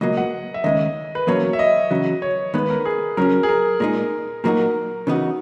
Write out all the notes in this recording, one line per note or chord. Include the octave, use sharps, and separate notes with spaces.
C#2 B2 F#3 A#3 D#5
F#5
E5
D#2 C#3 G#3 D#5
B4
E2 B2 F#3 A#3 C#4 C#5
E5
D#5
E2 C#3 F#3
C#5
D#2 D#3 G#3 B3 B4
A#4
G#4
F#2 C#3 F#3 C#4 A#4
G#4
A#4
A#2 G#3 D#4 A#4
A#2 F#3 A#3 D#4 F#4 A#4
C#3 E3 B3 D#4 F#4